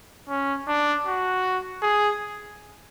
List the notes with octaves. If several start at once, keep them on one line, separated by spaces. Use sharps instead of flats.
C#4
D4
F#4
G#4